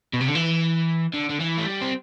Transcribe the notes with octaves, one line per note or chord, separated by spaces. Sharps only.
B2
C3
D3
E3
D3
D3
E3
A3
G3
C4